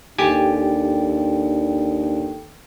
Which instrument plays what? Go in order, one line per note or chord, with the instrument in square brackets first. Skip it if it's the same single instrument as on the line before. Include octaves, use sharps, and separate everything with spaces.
[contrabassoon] D#2 [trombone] D4 [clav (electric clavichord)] G4 G#5 [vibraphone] A4 G5